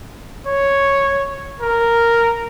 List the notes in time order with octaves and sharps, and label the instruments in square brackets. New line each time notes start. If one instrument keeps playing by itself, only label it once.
[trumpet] C#5
A#4